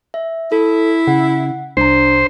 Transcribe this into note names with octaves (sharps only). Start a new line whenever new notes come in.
E5
E4 A4
C#3 F#5
C2 D4 C5 A#5